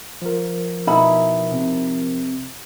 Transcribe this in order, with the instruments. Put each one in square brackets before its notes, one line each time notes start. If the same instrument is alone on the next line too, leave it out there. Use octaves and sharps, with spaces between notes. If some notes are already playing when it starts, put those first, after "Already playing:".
[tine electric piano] F3 A#4
[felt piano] B2 [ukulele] D#4 E4 B5
[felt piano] C3